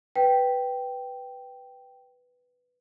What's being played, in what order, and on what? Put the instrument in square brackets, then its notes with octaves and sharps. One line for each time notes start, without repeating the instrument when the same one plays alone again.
[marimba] B4 [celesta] G5